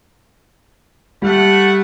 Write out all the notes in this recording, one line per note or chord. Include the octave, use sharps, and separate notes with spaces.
G3 A3 F#5